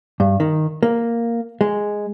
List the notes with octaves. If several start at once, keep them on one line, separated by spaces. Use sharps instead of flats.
G2
D#3
A#3
G#3